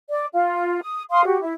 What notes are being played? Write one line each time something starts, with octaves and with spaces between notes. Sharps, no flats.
D5
F4
D#6
F5 C6 D#6
F#4 G4
E4